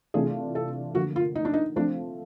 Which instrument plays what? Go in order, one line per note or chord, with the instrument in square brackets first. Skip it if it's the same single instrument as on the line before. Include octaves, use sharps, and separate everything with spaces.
[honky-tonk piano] C3 E3 A3 D4 F4 [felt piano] G#4
[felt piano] A4
[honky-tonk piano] D3 F3 A#3 [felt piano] F#4
[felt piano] F4
D#4
D4
D#4
[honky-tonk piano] F3 A3 C4 F4 [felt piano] D4